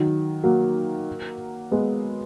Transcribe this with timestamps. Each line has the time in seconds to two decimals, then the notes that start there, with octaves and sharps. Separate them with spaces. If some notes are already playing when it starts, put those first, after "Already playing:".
Already playing: D#3 F#3
0.43 F#3 A#3
1.71 G#3 B3